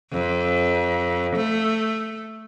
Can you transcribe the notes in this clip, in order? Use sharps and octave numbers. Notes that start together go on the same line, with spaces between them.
F2
A3